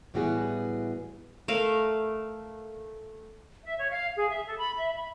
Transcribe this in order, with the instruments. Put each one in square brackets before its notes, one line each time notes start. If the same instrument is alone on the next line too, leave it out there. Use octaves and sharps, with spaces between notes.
[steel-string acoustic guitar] A2 E3 G3 B3 F#4 G#4
[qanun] A3 A#4 F5
[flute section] E5
C#5
F5
G#4
E5
A4
B5
E5
B5